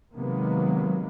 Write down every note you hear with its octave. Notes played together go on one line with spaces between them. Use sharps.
C3 D#3 F#3 G#3 A#3 B3